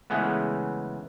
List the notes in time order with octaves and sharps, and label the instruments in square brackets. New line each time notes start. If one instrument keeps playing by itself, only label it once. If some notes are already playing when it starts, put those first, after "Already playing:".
[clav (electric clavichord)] C#3 E3 G#3 A3 B3